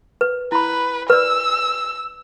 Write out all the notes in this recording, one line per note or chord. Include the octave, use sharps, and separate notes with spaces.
B4
E4 B4 B5
B4 D5 E6